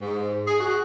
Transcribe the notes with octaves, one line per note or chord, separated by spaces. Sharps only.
G#2
G#4
F#4